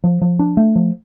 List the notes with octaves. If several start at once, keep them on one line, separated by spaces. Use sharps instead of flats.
F3
F3
D4
A3
F3